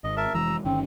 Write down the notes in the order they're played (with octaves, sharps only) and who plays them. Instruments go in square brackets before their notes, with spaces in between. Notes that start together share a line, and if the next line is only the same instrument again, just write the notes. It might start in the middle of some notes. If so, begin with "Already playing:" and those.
[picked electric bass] G#1 [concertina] D#5
[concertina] A#4 E5 A5
[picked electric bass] F1 E3 G#3 [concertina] A#5 E6
[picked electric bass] G1 D#3 C#4 [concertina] C4